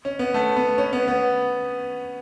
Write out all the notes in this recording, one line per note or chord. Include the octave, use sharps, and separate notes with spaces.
C#4
B3
A3
B3
C#4
B3
B3